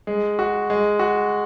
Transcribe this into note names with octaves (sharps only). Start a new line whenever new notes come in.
G#3
F#4
G#3
F#4